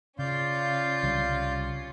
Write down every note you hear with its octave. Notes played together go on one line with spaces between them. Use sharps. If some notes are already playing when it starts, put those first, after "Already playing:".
C#3 C#4 F4 D5 F5 G6
C2 C#3 G3